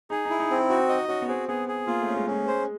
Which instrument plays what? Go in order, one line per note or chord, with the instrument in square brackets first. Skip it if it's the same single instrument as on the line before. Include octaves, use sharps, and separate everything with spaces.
[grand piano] D#4 [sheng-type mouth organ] G#4
[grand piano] D#4 [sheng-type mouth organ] E4
[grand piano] D#4
[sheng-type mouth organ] C4 [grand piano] D#4
[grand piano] D#4 [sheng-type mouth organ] F#4
[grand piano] D#4 [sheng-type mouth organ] D#5
[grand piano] C#4 [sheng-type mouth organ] F#4
[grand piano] B3
[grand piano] C4 [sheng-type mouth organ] G#4
[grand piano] B3 [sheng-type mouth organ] G#4
[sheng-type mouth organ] G#4
[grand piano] A#3 [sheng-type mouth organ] F4
[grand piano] A3
[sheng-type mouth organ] C#4
[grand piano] G#3
[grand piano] G#3 [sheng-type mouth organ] C#4
[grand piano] G#3 [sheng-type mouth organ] C5